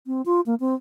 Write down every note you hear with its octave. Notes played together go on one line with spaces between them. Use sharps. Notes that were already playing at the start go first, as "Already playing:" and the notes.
C4
F4
A#3
C4